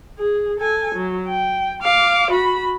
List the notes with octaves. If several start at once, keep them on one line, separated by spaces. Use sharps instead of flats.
G#4
A4 G#5
F#3
G5
F5 D6
F#4 B5